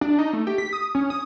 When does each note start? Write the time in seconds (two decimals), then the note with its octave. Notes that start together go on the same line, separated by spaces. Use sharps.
0.01 D4
0.19 D#4
0.33 A3
0.47 G4
0.58 B6
0.73 D#6
0.95 C#4
1.10 D#6